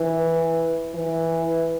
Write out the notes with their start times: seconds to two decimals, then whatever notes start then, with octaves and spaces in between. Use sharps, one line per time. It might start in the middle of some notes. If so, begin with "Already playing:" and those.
Already playing: E3
0.95 E3